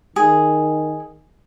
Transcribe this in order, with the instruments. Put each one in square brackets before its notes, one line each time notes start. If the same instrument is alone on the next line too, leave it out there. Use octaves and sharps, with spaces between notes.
[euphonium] D#3 [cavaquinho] G#4